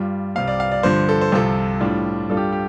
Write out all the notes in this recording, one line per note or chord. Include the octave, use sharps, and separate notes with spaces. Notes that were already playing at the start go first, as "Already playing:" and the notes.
Already playing: G2 G3 F4
C2 C3 G3 F5
D5
F5
D5
G2 D3 F3 C5
A4
C5
C2 C3 F3 C4 F4 A4
A2 G3 D4 F4
G2 G3 D4 F4 A4
G4
G4